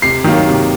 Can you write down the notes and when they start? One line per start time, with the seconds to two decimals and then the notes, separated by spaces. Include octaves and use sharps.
0.02 C3 C7
0.24 D#3 F#3 A#3
0.48 C3